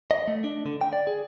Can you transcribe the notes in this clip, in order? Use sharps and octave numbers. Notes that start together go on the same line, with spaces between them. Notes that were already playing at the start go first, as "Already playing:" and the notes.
D#5
A3
D4
D3
G5
D5
G#4